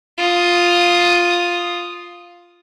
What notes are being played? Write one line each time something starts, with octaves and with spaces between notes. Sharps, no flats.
F4 D#6